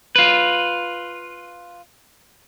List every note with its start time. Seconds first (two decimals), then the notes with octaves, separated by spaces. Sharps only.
0.16 F4 B4